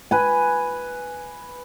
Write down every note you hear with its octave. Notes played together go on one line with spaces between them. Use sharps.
B4 G#5